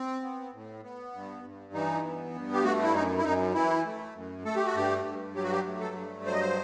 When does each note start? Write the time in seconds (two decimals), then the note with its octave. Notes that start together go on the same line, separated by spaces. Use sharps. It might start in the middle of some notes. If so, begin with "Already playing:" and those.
Already playing: C4
0.23 B3
0.53 A2
0.83 B3
1.13 G2
1.44 G2
1.74 E3 D#4
2.04 B3
2.34 G2
2.53 G4
2.64 A3 F#4
2.83 E4
2.94 F#2 D#4
3.18 E4
3.25 F#2 D#4
3.54 E3 E4
3.85 A3
4.15 F#2
4.45 A3 A4
4.56 G4
4.65 F#4
4.75 G2 G4
5.06 G2
5.35 F#3 G4
5.43 F#4
5.52 G4
5.66 A3
5.80 A4
5.95 G2
6.26 F#3 C5
6.33 D#5
6.41 C5